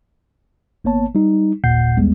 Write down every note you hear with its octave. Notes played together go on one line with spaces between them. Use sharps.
G#1 A#3 B3 C#5 A5
G3 D#4
G1 D#2 A#2 F#5 G6 C7
A1 D#2 G3 G#3 B3